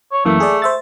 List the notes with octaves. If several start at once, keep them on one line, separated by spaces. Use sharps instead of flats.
C#5
F#2 E3 A3 A#3
G#4 D5
C5 E5 A6